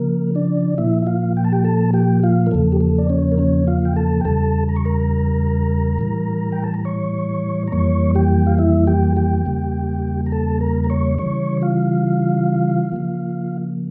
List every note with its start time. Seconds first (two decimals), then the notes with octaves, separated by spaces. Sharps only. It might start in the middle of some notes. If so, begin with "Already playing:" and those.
Already playing: C#3 F3 A#3 A#4
0.35 D4 D5
0.78 A#2 F3 A#3 E4 E5
1.02 E5
1.07 F4 F5
1.37 G5
1.44 A5
1.52 G4 G5
1.64 A4 A5
1.93 G4 G5
2.23 F4 F5
2.47 A#4
2.51 E2 C#3 F3 A#3 A4
2.72 G4
2.81 A4
2.98 D5
3.10 C#4 C#5
3.32 A#4
3.38 C#4 C#5
3.67 F4 F5
3.85 G5
3.96 A4 A5
4.21 G5
4.25 E2 C#3 G3 A4 A5
4.69 A#5
4.76 C#6
4.85 A#4 A#5
5.99 A2 E3 G3
6.52 G5
6.64 A5
6.74 A#5
6.85 C#5 C#6
7.68 A#5
7.72 F2 E3 G3 A#3 C#5 C#6
8.15 G4 G5
8.47 F5
8.58 E4 E5
8.87 G4 G5
9.16 G4 G5
9.46 E2 C#3 G3 A#3
10.26 A#5
10.32 A4 A5
10.61 A#4 A#5
10.84 A#5
10.90 C#5 C#6
11.18 C#3 E3 G3 C#5 C#6
11.62 F4 F5
12.92 C#3 F3 A#3